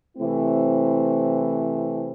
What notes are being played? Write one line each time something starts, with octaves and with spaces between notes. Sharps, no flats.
C3 E3 A3 C4 E4